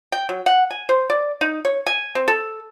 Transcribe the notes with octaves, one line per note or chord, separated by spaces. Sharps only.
G5
F#3
F#5
G#5
C5
D5
D#4
C#5
G#5
C4
A4